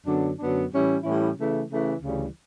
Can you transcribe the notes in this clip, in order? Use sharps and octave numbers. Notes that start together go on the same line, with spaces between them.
F#2 D3 F#3 B3 D4
F#2 D3 F#3 B3 D4
A2 E3 G3 C#4 E4
A2 E3 G3 C#4 E4
C#3 E3 A3
C#3 E3 A3
D2 C#3 E3 G3